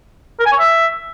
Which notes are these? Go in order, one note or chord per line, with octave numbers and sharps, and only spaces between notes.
A#4
G#5
C#5
E5